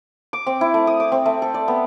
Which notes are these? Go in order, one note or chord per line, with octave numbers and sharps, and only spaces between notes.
D6
C4
E4
A3
D#6
D6
C4
A3
A4
D5
B3